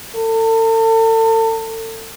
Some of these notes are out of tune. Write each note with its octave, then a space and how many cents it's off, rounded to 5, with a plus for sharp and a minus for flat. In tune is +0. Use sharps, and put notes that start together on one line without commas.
A4 +35